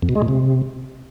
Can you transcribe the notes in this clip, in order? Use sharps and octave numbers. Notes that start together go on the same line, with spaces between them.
F2
B2
G#3
A#2
C3